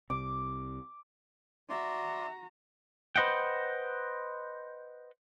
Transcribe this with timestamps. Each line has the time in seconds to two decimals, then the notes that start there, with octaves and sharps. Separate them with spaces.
0.10 C2 C3 D6
1.69 F#4 D5 E5 A#5 C6
3.16 B4 C5 D#5 F#5 G5